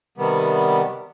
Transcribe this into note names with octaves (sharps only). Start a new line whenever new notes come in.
C3 D#3 G3 B3